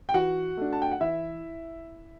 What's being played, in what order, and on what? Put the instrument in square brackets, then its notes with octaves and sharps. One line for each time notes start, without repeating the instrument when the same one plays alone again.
[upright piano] G5
E3 F#4 F#5
A3 D4
A5
G5
F#5
E3 E4 E5